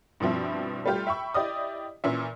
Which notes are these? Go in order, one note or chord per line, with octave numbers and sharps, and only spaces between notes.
G2 B2 F3 C4 E4
G3 A3 F4 G4
E5 G5 B5 C#6 E6
E4 G4 D5 D#5 D#6
A#2 E3 A#3 C#4 E5